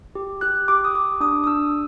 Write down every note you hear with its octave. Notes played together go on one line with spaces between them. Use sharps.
G4
G4 F#6
G4 D6
D#6
G4 D6
D4 D#6
D#6
D4 E6